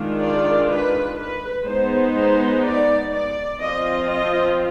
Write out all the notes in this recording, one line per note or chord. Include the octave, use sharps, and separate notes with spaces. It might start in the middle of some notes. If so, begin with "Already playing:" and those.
Already playing: D#3 G#3 D4 F4
D5
B4
B4
G#3 B3 D#4 C5
C5
D5
D5
F3 C4 F4 D#5
D#5